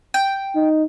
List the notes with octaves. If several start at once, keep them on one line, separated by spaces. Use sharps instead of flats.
G5
D#4